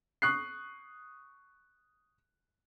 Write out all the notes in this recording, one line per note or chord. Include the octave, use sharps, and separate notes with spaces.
C#6 D#6 F#6 C7